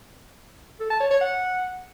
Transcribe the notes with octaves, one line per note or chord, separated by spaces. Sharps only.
A4
A5
C#5
C#5
F#5